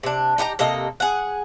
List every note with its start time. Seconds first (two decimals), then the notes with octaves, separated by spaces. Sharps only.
0.03 C3 D4
0.38 D#4 G4 A#4 A#5
0.59 C3 A#3 A4 D#5
1.00 G#4 F#5